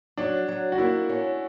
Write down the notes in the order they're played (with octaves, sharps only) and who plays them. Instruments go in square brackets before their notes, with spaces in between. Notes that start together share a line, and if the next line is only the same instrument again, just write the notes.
[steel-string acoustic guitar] F#3 [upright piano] D4
[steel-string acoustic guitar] F#3
[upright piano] F#4
[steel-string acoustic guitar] A#3 [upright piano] E4
[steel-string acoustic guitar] C#4